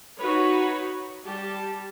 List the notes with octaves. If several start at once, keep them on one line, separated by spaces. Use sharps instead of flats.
D#4 F#4 B4 C#5
G3 G4 A5